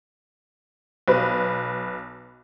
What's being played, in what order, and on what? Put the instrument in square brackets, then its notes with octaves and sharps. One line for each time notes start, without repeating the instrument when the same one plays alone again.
[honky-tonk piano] B1 B4